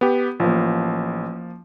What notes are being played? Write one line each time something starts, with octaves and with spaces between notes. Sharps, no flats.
B3 G4
A1 F3 A#3